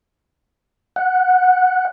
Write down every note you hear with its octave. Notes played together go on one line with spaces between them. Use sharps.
F#5